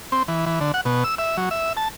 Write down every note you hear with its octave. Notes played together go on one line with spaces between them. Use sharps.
C4
E3
E3
D3
F#5
B2
E6
E5
F#3
E5
A5